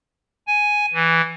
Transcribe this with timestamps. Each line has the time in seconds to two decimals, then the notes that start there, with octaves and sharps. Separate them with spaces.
0.47 G#5
0.94 E3